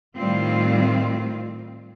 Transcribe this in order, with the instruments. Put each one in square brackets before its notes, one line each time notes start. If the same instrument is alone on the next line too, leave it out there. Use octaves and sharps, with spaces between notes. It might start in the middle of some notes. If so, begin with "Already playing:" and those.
[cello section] A2 D#3 G3 C4 F4